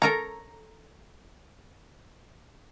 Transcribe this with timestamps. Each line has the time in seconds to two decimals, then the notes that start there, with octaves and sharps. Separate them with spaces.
0.02 A4 A#4 C#5 A#5